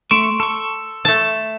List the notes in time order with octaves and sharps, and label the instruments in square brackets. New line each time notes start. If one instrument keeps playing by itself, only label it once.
[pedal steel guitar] A3 C#6 [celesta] C6 D7 E7
[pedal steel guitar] A4 C#6
[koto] A3 A5